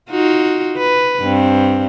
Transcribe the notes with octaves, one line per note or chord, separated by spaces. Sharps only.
D#4 F4 F#4
B4
G2 C4